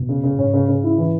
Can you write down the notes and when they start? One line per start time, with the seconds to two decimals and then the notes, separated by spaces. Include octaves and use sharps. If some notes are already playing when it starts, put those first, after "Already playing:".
Already playing: B2
0.09 C#3
0.24 C#3
0.33 A#2
0.39 G#2 C#4
0.53 C#3
0.68 C#3
0.83 E4
0.98 E3